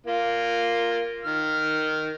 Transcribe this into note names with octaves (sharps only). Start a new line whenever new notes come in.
A#3 F4
D#3 F6